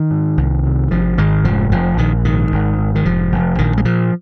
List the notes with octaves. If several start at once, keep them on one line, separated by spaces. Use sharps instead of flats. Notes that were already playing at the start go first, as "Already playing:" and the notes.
Already playing: D#3
G#2
C2
C3
G#1 F3
G#2 D#3 G#3
F1 F3
F1 F3
A#1 D#3
G#2 D#3
G#1
G#2
D#3
F1 F3
F1
A#1 D#3
G#3
A#2 F3